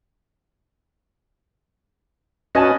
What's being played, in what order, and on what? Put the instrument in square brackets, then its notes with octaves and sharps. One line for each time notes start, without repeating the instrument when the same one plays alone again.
[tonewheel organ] C#4 F#4 B4 [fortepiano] D#5 G#5 A5